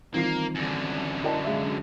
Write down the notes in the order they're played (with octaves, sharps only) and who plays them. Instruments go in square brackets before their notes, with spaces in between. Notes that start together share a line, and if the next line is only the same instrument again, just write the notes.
[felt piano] D#3 F4 C7 [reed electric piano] E3 G3 C4 [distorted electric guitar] A#3
[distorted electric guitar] F#2 D3
[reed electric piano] E4 D#5 A5 [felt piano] A#4 D5 G5
[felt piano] G#3 E5 [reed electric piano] D5 F5
[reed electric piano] D4 F#4